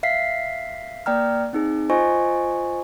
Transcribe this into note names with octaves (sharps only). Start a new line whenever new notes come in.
E5 F5 B6 C7
A#3 D5 G5 A#5 F6
C4 D#4 G#4
F4 C5 D#5 G#5 C#6